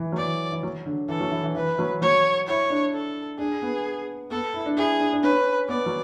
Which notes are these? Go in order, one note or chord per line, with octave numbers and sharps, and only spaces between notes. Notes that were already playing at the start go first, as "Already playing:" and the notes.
Already playing: E3
F#3
E3 D5
E3
F#3
D3
E3 A4
F#3
E3
E3
E3 B4
F#3
F#3 C#5
E4 C#5
D4
A4
D4 G#4
B3
B3 A4
E4
D4
E4 G#4
D4
D4
C#4 B4
B3 D5
F#3